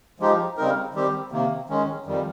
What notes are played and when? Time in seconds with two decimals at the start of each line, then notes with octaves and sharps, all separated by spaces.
0.20 F3 G#3 D#4 G4
0.57 C#3 G3 C4 D#4 A#4
0.94 D#3 G3 C4 G4
1.32 C3 D#3 A#3
1.70 D#3 G#3 C#4
2.06 F2 D#3 G3